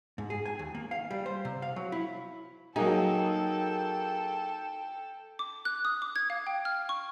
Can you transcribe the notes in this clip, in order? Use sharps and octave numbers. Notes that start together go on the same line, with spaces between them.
G#2
G#4
G#5
D#2
A#3
F5
G3
C5
C3
F5
F#3
E4
F#3 A#3 D#4 G#4 A4 G5
D6
F#6
D#6
D6
G#6
F5
G5
F6
C#6